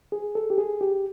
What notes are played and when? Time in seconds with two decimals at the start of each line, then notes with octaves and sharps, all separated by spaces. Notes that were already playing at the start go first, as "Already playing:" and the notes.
0.12 G#4
0.35 A4
0.50 G4
0.58 G#4
0.81 G4